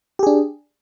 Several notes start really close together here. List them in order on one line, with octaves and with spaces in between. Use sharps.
G4 G#4 D4